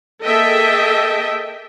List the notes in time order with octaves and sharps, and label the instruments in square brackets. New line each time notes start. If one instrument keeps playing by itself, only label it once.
[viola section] A#3 G#4 A4 D#5 E5 G5